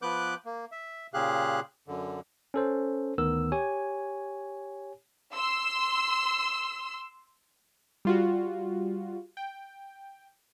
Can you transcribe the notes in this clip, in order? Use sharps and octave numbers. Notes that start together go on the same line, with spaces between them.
F3 B3 B4 D6 F#6 G6
A#3
E5
A#2 C#3 G4 G#4 F5 F#6
F#2 D3
C#4 A4 C5
D2 D#3 B3 A#4 E6
G4 C#5 G#5
C6 E6
G3 F4 F#4
G5